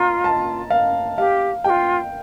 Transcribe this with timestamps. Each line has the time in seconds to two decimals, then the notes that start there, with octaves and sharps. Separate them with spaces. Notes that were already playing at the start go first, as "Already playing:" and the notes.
Already playing: F4 A#5
0.24 A5
0.70 F5
1.18 G4 F5
1.64 G4 G5
1.70 F4